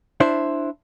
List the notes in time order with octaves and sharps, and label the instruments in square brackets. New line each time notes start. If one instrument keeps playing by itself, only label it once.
[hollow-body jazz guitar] D4 E4 C5